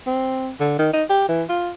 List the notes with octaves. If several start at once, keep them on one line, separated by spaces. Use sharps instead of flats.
C4
D3
D#3
D#4
G4
E3
F4